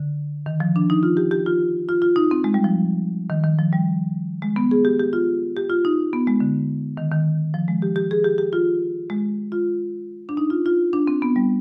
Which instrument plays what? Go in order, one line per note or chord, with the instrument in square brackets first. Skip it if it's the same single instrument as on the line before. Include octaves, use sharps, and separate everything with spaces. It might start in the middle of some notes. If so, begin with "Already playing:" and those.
Already playing: [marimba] D3
D#3
F3
D4
D#4
F4
G4
G4
F4
F4
F4
D#4
C4
G#3
G3
F3
D#3
D#3
F3
G3
G#3
B3
G#4
G4
G4
F4
G4
F4
D#4
B3
G#3
D3
D#3
D#3
F3
G#3
G4
G4
G#4
G4
G4
F4
G#3
F4
D4
D#4
F4
F4
D4
C4
B3
G3